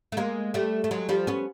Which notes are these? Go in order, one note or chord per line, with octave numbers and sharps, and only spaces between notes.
A3
G#3 A#3
G3 A3
A3
F#3 G#3
F3 G3
B3 C#4